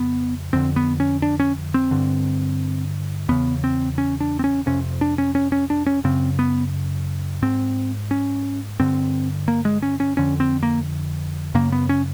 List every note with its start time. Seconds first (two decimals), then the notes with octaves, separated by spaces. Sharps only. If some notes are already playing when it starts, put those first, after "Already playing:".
Already playing: F2 C#3 B3
0.53 F2 D3 C4
0.76 B3
1.00 C#4
1.22 D4
1.40 C#4
1.74 C4
1.91 G2 D3
3.29 E2 C#3 B3
3.64 C4
3.98 C#4
4.20 D4
4.39 C4
4.44 C#4
4.66 F2 C3 C#4
5.01 D4
5.18 C#4
5.35 C#4
5.52 C#4
5.70 D4
5.86 C#4
6.04 F#2 C#3 C4
6.39 B3
7.42 G#2 C4
8.11 C#4
8.80 G2 D3 C4
9.48 A#3
9.65 G#3
9.82 C#4
10.00 C#4
10.17 F2 D3 C#4
10.40 C4
10.63 A#3
11.54 F#2 C#3 A#3
11.72 B3
11.89 C#4